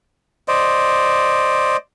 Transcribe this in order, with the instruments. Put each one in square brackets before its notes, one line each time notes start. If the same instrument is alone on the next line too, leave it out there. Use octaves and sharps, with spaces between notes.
[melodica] C5 D5 D#5